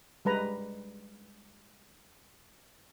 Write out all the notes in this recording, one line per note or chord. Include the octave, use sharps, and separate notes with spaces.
G3 G#3 B4 A#5